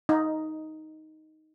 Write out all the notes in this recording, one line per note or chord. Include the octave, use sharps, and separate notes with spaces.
D#4